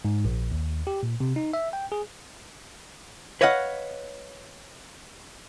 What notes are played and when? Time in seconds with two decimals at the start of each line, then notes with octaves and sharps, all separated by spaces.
0.05 G#2
0.25 A#1
0.52 D#2
0.87 G4
1.03 A#2
1.20 C3
1.36 D#4
1.53 E5
1.73 G5
1.92 G#4
3.41 B4 C#5 D#5 F5 F#5